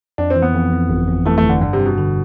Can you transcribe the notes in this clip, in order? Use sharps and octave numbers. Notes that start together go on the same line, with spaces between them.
F2 D4
C4
E3
B3
F2
F2
G1
F2
E3 A3
A3
G1
D3
G2 D3
C3
G2
B2
D3